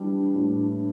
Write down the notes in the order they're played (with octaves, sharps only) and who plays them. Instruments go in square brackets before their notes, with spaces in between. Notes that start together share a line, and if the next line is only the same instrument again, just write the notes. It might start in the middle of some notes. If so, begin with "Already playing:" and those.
Already playing: [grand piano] E3 G3 [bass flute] D4
[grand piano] A2